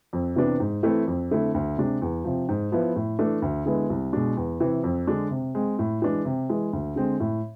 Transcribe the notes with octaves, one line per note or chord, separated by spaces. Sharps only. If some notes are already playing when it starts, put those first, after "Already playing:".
F2
C3 E3 B3 D4
G#2
E3 A3 C4 E4
F2
D3 A3 C4 E4
D2
C3 G#3 D4
E2
C3 F3
G#2
F3 B3 E4
A2
E3 A3 D4
D2
D3 G#3 B3 E4
C2
B2 G#3 D4
E2
C3 E3
F2
D3 G#3 D4
C3
G#3 C4
A2
E3 G#3 D4
C3
E3 G#3
D2
D3 G#3 C4
A2